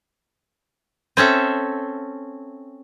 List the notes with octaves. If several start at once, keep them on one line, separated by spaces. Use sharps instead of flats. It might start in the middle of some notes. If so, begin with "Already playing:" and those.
C4 C#4 A4 E5